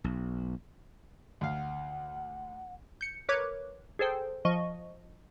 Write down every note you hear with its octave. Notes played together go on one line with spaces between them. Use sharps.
B1
D2 F5 F#5
G6 C#7
A#4 B4 C#5 D6 F#6 G#6
G#4 A4 C5 G5
F3 D#5 C#6